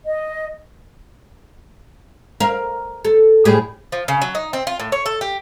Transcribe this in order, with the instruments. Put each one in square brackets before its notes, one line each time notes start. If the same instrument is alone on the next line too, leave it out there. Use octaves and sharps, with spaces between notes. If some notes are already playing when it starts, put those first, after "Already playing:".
[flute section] D#5
[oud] A#4 F5
A4
A2 G3 G#4
[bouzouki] F3
C#3
F#3
D#4
C4
F4
A2
C#5
A4
G4